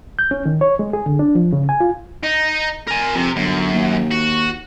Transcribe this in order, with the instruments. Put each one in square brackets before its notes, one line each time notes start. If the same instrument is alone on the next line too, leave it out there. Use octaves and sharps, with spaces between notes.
[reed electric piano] G6
C#4
D#3
C#5
G#3
G#4
D3
D4
F3
C#3
G#5
F4
[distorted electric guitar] D#4
A#4 G#5
[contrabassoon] F2 [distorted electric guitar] C3
[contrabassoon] G1 [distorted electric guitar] F#2
[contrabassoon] D#2
[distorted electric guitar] F#4